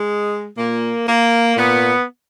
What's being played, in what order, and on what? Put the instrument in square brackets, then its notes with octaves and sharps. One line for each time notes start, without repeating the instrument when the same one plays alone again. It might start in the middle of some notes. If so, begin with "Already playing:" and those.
Already playing: [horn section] G#3
A#2 A#3
A#3
A#2 B3